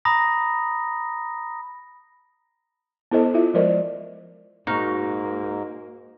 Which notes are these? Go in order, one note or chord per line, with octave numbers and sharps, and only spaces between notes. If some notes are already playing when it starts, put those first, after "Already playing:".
A#5 B5 D#6 A#6
B3 E4 A4 C5 D#5
E4 F4 E5
F3 G#3 A#4 C5 D5 D#5
G#2 A#3 D#4 F#4 F6